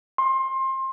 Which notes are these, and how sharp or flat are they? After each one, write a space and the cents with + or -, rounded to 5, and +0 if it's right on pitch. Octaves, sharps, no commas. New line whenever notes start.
C6 +25